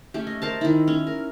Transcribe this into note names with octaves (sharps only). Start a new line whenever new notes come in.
A3 C#4 G4
D#5
A#4 C5 A5
D#3 E4
C#4
A#4